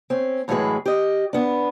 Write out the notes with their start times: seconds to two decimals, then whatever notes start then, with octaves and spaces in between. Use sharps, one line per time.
0.10 C4 C#4
0.48 F#2 A2 E3 G#3 G#4 B4
0.86 G4 D#5
1.33 B3 D4